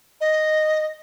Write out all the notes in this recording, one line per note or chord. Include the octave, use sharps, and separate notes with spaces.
D#5